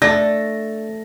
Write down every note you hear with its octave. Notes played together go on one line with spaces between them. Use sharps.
A3 D4 A#6